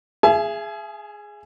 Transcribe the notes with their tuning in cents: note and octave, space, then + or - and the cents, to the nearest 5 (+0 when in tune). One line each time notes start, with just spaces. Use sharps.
G#4 +0 E5 +35 G#5 +40